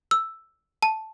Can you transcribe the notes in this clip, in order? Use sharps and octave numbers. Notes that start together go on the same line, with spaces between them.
E6
A5